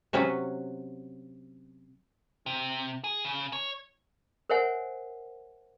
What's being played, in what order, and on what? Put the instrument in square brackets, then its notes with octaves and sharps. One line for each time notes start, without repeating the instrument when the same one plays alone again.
[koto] C3 F#3 B3 C#4 B4
[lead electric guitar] C3
G#4
C#3
C#5
[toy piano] A#4 C5 C#5 E5 F#5 G#5